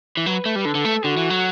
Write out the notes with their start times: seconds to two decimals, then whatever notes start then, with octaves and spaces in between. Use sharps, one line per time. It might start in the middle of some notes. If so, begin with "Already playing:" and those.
0.17 E3
0.25 F#3 B4
0.45 A3
0.56 G3
0.65 D3 A4
0.75 D3
0.85 A3
1.04 D3 F#4
1.17 E3
1.30 F#3